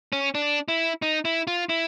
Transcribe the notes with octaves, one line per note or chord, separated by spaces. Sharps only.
C#4
D4
E4
D#4
E4
F4
E4